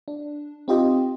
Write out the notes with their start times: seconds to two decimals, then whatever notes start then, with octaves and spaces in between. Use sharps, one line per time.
0.08 D4
0.68 C4 D#4 F4 G4 C5 D#5